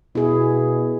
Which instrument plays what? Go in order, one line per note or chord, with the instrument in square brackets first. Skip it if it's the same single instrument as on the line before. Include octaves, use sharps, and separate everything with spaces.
[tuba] B2 [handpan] E4 G#4